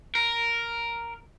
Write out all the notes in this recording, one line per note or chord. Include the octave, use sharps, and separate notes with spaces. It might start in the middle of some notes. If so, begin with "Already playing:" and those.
A#4